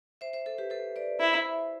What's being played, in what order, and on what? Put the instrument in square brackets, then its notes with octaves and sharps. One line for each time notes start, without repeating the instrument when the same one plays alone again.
[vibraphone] C5 E5
C5 E5
A4 C5
G4 B4
A4 C5
B4 D5
[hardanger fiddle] E4 [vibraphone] C5 E5